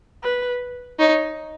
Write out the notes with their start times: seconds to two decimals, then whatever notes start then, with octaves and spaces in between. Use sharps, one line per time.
0.23 B4
0.99 D#4 C#5